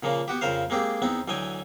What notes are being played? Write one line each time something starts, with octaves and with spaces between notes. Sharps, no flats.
A#2 C#3 F3 A#3
B3 F#4 G4
F2 C#3 A#4 C5 F5
G#3 A#3 C4 G4 G#4
E2 B3 C4 D#4
D2 E3 F#3 D#5 G5 G#5